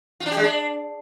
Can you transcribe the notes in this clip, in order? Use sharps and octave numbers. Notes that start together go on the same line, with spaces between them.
F4
D4
G4
G#3
D4